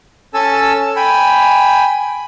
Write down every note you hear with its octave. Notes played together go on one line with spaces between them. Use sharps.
C#4 A4 G#5 A5 E6
G5 G#5 B5